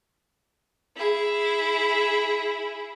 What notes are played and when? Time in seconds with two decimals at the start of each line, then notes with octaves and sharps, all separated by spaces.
0.96 E4 G#4